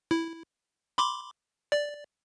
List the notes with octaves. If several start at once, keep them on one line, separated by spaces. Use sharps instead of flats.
E4
B5 C6 D6
D5